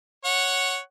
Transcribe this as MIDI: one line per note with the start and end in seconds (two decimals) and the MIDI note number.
0.25 0.77 73
0.25 0.77 78